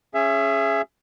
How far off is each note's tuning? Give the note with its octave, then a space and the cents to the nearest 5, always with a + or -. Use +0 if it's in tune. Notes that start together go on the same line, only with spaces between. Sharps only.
C#4 -5 G#4 +0 E5 +25